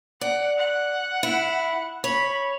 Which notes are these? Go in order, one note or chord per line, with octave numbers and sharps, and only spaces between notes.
D5 F#5
F#5
E4
C#5 B5